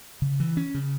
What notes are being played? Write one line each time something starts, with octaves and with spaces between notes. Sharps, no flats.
C#3
E3
C#4
C#3